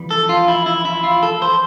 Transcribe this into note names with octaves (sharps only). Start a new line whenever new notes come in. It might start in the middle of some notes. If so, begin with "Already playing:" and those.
Already playing: F2 E3 G3
A4
F4
E4
E4
E4
F4
A4
C5